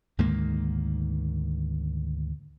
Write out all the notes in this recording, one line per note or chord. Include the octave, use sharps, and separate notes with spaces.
D2 G#2 D#3 A#3